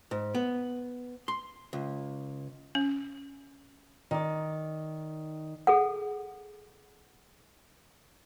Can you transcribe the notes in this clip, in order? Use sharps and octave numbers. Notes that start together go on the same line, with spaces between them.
G#2
B3
C6
C#2
C#4
D#3 D5
G#4 A4 F#5